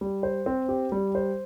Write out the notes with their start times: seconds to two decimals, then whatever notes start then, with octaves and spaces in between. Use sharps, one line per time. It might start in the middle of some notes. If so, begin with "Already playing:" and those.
0.01 G3
0.23 C5
0.46 C4
0.69 G4
0.92 G3
1.15 C5